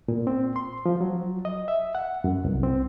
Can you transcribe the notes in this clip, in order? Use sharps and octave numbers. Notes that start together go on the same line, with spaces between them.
A#2
C4
C6
F3
F#3
D#5
E5
F#5
F#2
C2
C4